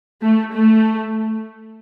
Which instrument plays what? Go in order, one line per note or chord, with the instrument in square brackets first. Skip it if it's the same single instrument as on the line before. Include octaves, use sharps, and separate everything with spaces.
[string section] A3
A3